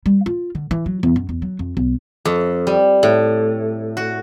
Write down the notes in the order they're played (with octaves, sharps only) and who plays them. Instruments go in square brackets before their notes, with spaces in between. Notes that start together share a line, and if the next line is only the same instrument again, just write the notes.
[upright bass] G3
F4
D3
E3
F#3
E2
F#2
E2
F#3
F2
B1
[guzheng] F2
G3
A2
F#4